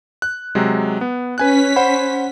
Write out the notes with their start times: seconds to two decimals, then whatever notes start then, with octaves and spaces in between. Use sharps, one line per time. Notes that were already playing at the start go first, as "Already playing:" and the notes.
0.22 F#6
0.55 C3 F#3 G#3
1.01 B3
1.38 C#4 B4 G#5 F#6 B6
1.76 C5 F#5 B5